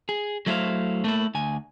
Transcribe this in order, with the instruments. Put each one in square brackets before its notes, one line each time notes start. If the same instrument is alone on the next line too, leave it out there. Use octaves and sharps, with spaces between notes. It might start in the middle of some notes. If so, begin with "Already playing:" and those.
[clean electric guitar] G#4
F#3 A3 E4 G4 C5 F5
A3 A#3 E4
D2 G#5